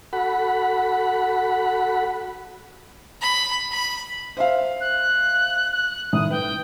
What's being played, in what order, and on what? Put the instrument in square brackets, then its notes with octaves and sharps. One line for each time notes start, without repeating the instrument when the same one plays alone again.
[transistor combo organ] F#4 A4 F#5 B5
[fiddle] B5
B5
[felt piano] C5 E5 F5
[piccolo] F#6
F#6
[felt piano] A2 D#3 [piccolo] D#6
[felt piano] B4 [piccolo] G5